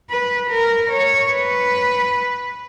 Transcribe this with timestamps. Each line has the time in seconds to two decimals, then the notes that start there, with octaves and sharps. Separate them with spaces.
0.10 B4
0.51 A#4
0.91 C#5
1.32 B4